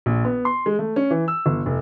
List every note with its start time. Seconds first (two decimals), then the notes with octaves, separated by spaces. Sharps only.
0.06 A#1
0.25 B3
0.45 C6
0.66 G#3
0.79 A3
0.96 C#4
1.10 E3
1.28 E6
1.46 G1
1.66 F1